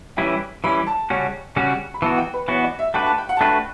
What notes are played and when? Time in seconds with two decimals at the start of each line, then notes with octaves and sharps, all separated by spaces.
0.17 E3 G3 C#4 E4 G5
0.64 E3 G3 C#4 E4 B5
0.87 A5
1.10 C#3 G3 C#4 F#4
1.56 C#3 G3 C#4 F#4
1.94 B5
2.02 E3 B3 F#4 A5
2.18 G5
2.34 B4
2.48 E3 B3 F#4 C#5
2.64 D5
2.79 E5
2.94 A3 D4 F#4 B4 G5
3.06 A5
3.18 G5
3.29 F#5
3.37 A5
3.41 A3 D4 F#4 B4 G5